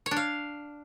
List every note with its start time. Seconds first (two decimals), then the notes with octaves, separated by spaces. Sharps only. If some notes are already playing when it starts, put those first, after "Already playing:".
0.06 C#5
0.11 D4
0.16 F5